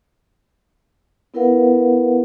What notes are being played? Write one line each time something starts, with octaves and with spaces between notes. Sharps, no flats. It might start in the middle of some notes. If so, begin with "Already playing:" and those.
B3 E4 A#4 B4 F5 F#5